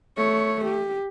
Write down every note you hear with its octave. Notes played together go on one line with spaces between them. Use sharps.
A3 C#5
G4